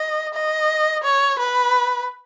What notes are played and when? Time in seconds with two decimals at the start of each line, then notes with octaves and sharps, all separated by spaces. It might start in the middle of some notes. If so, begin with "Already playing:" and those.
Already playing: D#5
0.34 D#5
1.04 C#5
1.39 B4